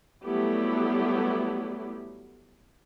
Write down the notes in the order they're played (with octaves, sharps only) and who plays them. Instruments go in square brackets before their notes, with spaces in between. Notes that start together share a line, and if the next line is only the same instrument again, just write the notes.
[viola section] F#3 G3 A3 B3 E4 G4